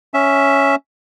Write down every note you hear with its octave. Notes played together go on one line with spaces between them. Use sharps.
C#4 E5